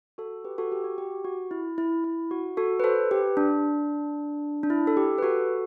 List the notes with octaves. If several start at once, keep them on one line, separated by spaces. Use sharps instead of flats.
F#4 A4
G4 B4
F#4 A4
G4
F#4
G4
F#4
E4
E4
E4
F#4
F#4 A4
B4
A4 C5
G4 B4
D4
D4
E4
A4
G4
B4
F#4 A4